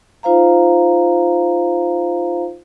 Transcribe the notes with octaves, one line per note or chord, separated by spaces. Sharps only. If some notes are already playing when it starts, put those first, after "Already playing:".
D#4 F4 C5 F5 A#5